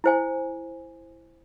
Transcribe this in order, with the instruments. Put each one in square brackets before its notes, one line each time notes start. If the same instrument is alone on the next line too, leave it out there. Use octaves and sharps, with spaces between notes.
[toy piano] E4 C5 G#5